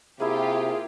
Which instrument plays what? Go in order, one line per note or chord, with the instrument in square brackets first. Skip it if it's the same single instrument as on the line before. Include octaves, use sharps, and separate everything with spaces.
[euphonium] C3 [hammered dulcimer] A#3 E4 [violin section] F4 G4 [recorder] G#4